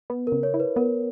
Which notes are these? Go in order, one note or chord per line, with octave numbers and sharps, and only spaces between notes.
B3 B4
A#4
C#3
C#5
E4
B4
B3 A#4